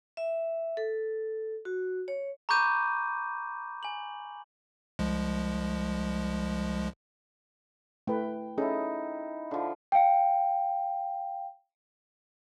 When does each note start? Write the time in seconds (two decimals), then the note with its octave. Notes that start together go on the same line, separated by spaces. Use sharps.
0.17 E5
0.77 A4
1.65 F#4
2.08 C#5
2.49 A#5 B5 C#6 D6 G6 D#7
3.83 G#5 F#7
4.99 C2 F3 G#3
8.07 A3 E4 B4 G5
8.58 C#4 D#4 E4 G#4 A4
9.51 D3 F3
9.92 F5 G5